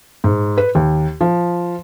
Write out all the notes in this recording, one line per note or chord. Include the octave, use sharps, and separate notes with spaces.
G#2
B4
D#2
F3